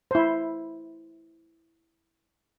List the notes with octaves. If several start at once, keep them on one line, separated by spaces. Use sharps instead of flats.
E4 C5